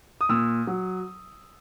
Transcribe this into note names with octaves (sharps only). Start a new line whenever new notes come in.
D#6
A#2 E6
F#3